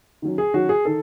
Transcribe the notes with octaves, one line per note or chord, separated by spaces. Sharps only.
D#3 F#3 C#4
G#4
D#3 F#3 C#4 F#4
G#4
D#3 A4